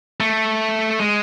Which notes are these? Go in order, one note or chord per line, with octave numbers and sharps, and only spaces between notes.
A3
G#3